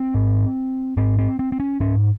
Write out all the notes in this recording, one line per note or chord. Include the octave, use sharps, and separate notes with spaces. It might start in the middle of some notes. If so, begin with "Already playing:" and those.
Already playing: C4
G#2
G#2 C4
C4
C4
C4
C#4
G#2 C#4